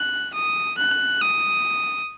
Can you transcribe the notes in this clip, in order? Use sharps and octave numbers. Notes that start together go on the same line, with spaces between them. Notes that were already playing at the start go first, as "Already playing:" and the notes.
Already playing: F#6
D#6
F#6
D#6